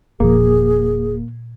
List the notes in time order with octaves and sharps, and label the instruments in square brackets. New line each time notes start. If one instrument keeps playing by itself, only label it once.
[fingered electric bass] E1 F3 [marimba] A#2 [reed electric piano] A#3 [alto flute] G#4